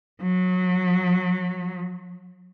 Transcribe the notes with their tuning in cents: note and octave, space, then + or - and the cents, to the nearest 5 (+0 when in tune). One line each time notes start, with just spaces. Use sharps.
F#3 -25